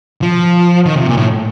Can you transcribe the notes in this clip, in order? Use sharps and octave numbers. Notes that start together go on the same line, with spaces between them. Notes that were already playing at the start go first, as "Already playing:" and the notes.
F3
D#3
C3
A#2
A2